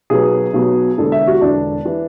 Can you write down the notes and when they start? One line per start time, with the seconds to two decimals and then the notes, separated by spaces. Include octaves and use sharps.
0.10 B1 B2 F#3 B3 G#4
0.53 B1 B2 F#3 B3
0.98 E1 E2 D3 A4
1.12 E5
1.27 F#4
1.41 E1 E2 D3 D4
1.85 E3